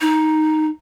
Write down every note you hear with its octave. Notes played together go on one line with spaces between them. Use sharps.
D#4